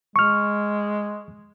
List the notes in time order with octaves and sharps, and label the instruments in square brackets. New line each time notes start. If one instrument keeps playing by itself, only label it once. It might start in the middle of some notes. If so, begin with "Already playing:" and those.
[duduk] G#3 [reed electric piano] C#6 F6